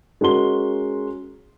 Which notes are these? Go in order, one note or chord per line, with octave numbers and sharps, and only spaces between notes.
G#3 C#4 F#4 A#4 C6 G7